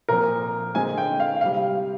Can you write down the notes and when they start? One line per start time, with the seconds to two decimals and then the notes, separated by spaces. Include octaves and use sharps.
0.09 A#2 F3 C4 A#4
0.75 D3 G#3 C4 G#5
0.98 G5
1.20 F5
1.41 C3 G3 F5